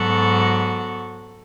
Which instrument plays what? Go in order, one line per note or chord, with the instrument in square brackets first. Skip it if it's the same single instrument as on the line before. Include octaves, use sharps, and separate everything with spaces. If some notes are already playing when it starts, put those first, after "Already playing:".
Already playing: [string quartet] G#2 F#3 B3 F#4 A4